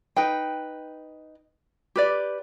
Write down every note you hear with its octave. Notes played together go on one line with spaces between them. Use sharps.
D#4 B4 G5
G4 B4 D5